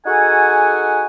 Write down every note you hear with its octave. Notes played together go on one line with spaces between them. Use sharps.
D#4 F#4 G#4 A4 F#5 G#5